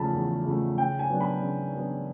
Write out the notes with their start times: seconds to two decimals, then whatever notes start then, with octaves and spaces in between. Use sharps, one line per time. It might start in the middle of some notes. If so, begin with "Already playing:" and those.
Already playing: E2 C#3 F3 A3 A5 B5
0.13 E2
0.45 C#3 F3 A3
0.77 C#3 G5
0.99 G#5
1.09 F#3 B3 D4
1.21 B5
1.42 C#3
1.74 F#3 B3 D4